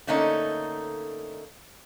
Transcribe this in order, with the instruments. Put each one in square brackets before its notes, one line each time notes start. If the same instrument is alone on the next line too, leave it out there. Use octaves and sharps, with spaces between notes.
[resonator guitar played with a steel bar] D3 A3 A#3 C#4 D#4